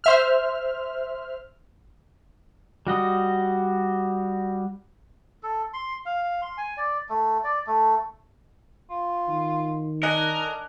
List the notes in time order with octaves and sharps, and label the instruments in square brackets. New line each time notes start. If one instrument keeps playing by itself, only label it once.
[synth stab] C5 E5 F6
[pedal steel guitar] G3 F#4 D#5
[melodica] A4
C6
F5
C6
G#5
D5
A3
D5
A3
[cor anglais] F4
[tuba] D#3
[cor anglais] D4 [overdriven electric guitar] A#4 [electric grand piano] D#5 G#5 F#6